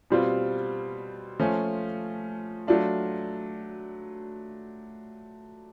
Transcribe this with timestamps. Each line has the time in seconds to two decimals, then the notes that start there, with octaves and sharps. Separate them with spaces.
0.10 B2 G3 C4 F4
1.40 F3 A3 C#4 F4
2.67 F#3 A3 D4 F4